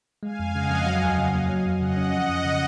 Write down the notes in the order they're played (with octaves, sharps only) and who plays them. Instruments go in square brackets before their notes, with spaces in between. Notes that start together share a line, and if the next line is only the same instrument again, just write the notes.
[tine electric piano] G#3 [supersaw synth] F5 G#5
[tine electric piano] F2
[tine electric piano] C#3 [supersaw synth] D#5 F#5
[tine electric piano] F2
F#3
D#2
C#3
A#3
F#3
F2
[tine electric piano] C#3 [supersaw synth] D#5 F#5
[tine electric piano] C#4
F3
F2
C#3